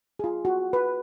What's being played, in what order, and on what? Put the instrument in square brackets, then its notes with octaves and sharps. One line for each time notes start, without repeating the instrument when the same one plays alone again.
[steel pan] F4 G#4
F#4
B4